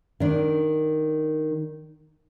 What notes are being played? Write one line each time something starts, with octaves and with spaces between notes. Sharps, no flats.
D#3 D4